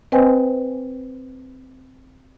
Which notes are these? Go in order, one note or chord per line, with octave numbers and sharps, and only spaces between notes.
C4 B4 C5 D#5 G5 G#5